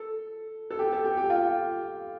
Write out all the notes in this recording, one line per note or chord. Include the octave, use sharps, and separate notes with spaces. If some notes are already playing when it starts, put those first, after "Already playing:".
Already playing: A4
A4
G4
A4
G4
G4
F4